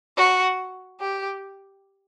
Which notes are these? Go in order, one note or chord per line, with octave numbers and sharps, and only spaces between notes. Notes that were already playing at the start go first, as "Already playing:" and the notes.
F#4
G4